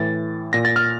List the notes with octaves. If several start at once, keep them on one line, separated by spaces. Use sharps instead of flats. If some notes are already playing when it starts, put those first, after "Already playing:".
Already playing: A2 E3 A6
A#2 A#6
A6
F6